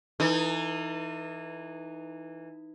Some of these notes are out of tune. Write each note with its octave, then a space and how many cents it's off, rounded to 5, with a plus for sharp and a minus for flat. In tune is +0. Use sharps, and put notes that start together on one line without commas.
E3 +0 D#4 +0 A4 +40